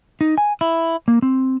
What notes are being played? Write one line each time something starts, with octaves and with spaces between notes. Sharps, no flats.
D#4
G#5
E4
A#3
C4